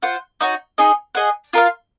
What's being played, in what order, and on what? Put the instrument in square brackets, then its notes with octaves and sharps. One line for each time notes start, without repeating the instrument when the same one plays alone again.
[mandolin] F4 C5 F#5
D#4 F#4 C#5
D#4 G#4 D#5
G#4 D#5 F#5
F4 A#4 F5